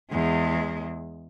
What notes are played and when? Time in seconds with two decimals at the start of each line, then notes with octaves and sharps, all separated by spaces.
0.10 E2 G#3